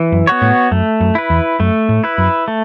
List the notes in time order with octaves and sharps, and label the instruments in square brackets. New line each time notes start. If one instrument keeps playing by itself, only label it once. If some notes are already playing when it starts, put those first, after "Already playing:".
Already playing: [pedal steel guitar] E3
[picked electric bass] F#2
[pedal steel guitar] B3 F#4 C#5
[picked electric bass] A2
[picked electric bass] F#2 [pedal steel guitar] A3
[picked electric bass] F#2
[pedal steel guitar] E4 B4
[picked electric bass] E2
[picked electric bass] F#2 [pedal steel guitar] A3
[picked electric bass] A2
[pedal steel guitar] E4 B4
[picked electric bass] F#2
[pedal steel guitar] A3